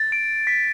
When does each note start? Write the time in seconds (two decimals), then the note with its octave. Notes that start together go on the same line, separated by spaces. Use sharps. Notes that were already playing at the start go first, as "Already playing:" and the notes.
Already playing: A6
0.12 D7
0.47 B6